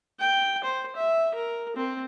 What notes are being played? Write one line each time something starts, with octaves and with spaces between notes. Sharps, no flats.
G5
C5
E5
A#4
C4